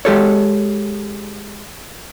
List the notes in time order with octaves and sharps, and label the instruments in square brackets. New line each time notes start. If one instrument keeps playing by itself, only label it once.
[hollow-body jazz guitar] G#3 G4 A4 C#5